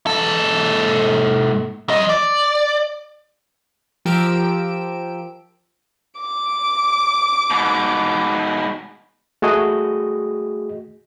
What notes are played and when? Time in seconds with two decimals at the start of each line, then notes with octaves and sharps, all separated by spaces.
0.07 G#2 A4
1.89 F3 D#5
2.09 D5
4.05 F3 G4 A#4 E6 D7
6.20 D6
7.51 G#2 B2
9.42 A3 F#4 G#4 D#5